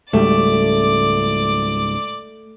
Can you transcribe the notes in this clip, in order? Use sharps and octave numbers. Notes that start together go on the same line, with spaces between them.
C#2 G#2 G3 A3 D5 D6